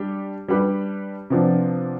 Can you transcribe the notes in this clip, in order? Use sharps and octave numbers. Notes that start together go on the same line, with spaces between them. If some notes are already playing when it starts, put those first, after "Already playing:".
Already playing: G3 D4 G4
G3 D4 G4 B4
C3 F3 B3 D4